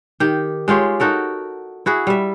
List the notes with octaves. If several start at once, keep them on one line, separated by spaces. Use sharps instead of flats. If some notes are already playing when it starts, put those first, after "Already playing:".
D#3 G4
G#3 F4 G4 C#5
D#4 F#4 A4 A#4
E4 F#4 G#4
G3 E5